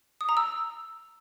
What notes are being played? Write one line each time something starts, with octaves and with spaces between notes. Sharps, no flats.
D#6
A#5
E6